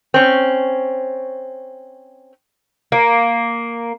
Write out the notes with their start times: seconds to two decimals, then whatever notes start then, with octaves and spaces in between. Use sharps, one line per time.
0.14 C4 C#4
2.92 A#3